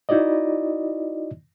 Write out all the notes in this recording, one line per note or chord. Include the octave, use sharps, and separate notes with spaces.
D#4 E4 F#4 D5 D#5